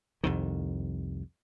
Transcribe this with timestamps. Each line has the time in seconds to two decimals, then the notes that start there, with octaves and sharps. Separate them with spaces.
0.24 C2 F2 D#3